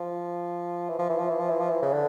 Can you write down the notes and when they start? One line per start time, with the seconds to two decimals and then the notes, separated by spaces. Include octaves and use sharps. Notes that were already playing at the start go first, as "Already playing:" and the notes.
Already playing: F3
0.89 E3
0.99 F3
1.09 E3
1.19 F3
1.29 E3
1.40 F3
1.50 E3
1.60 F3
1.70 E3
1.82 C#3
1.93 D3